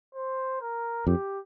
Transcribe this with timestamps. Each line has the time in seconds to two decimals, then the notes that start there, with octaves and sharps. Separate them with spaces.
0.15 C5
0.61 A#4
1.07 F2 G4